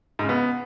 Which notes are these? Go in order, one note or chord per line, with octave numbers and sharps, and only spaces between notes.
G#2
C#3
B3